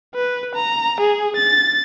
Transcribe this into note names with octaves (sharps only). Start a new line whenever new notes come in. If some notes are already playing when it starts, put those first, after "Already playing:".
B4
A#5
G#4
A6